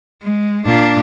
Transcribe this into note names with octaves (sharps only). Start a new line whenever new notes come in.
G#3
A#2 D4